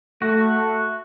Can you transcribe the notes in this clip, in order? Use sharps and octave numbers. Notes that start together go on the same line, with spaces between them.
A3 F#4